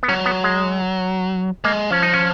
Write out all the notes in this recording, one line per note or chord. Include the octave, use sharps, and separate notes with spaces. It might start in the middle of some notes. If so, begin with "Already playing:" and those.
B3
F#3 C#4
B3
G#3
G#3 A#3
F3 C#4
D#4
C#4